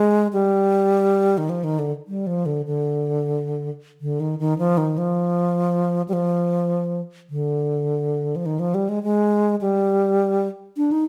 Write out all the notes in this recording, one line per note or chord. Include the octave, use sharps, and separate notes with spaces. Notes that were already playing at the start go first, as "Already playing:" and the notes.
Already playing: G#3
G3
D#3
F3
D#3
D3
G3
F3
D3
D3
D3
D#3
D#3
F3
D#3
F3
G3
F3
D3
F3
D#3
F3
G3
G#3
G#3
G3
D4
D#4